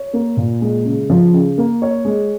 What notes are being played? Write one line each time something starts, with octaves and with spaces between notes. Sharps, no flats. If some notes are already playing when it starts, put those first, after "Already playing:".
Already playing: C#5
A#3
A#2
G#3
C#3
F3
C#3
A#3
C#5
G#3